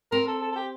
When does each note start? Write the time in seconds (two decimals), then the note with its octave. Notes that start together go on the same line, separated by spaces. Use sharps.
0.11 C4 A#4
0.27 A4
0.41 A4
0.51 A4
0.55 G4